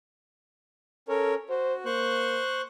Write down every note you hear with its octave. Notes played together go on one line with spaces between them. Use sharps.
C#4 A4 A#4 C#5
F#4 C5
A#3 C5 C#6 F#6